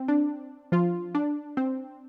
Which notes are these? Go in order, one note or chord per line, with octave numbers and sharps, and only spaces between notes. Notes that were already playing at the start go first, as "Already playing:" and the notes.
Already playing: C4
D4
F3 F4
D4
C4